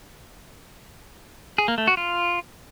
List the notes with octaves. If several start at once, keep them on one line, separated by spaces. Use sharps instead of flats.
G#4
A#3
A3
F#4
F4